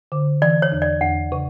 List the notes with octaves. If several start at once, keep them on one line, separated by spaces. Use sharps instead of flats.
D3
E3 D5
C#5
E2
D5
E2 F#5
C#3